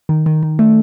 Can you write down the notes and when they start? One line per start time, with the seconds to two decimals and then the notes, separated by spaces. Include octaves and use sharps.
0.09 D#3
0.26 D#3
0.43 D#3
0.59 A3